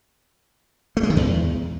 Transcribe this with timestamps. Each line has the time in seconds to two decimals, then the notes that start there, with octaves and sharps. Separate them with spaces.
0.97 A3
1.03 G#3
1.10 D#3
1.17 E2